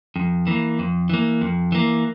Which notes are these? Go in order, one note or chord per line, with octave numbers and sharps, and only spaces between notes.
F2
E3 A#3
F2
E3 A#3
F2
E3 A#3